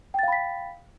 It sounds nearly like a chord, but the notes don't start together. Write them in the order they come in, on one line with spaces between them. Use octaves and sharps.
G5 A6 F5 B5 B6